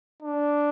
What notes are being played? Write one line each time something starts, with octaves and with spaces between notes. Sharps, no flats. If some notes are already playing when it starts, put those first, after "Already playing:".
D4